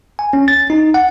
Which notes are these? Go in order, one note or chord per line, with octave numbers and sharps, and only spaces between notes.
G#5
C#4
A6
D#4
F#5